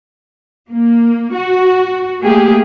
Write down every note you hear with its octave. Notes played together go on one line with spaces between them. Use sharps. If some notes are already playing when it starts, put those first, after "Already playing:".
A#3
F#4
A3 A#3 G4 G#4